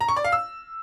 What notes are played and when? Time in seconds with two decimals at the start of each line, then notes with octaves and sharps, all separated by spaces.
0.01 A#5
0.09 C#6
0.17 D5
0.24 F5
0.32 E6